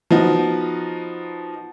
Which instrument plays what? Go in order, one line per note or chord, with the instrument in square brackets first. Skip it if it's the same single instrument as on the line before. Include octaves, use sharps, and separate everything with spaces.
[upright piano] F3 B3 D#4 F#4